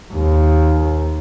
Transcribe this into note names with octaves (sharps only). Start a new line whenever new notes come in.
D#2